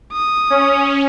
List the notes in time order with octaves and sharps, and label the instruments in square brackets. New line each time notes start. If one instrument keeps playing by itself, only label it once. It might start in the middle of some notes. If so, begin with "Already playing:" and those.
[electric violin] D#6
[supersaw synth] C#4